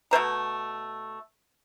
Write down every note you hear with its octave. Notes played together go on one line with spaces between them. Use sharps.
B2 A3 C5 A#5